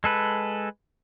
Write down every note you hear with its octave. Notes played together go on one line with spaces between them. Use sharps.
G#3 A4 B4